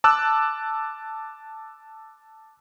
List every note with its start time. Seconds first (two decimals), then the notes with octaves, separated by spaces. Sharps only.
0.04 A5 D6 E6 F#6